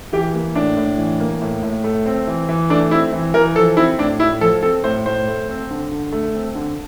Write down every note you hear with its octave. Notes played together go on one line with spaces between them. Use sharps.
E3 G4
A#3
A2 D4
A2
E3
A#3
A2
A2
A3
C4
E3
E3
A3 D4
C4 E4
E3
E3 A#4
F3 A4
C4 E4
A2 D4
A2 E4
F3 A4
C4 A4
A2 C5
A2 C5
A3
C4
D3
D3
A3
C4
D3